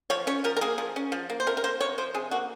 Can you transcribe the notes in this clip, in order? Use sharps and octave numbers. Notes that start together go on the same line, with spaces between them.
F3 C#5
C#4 C#5
F3 A#4
A#4
A#3 G#4
F3
C#4
F3
A#3
C5
C3 A#4
A#4
A#3 C5
C3 C#5
F3 C5
C3 G#4
A#3 F#4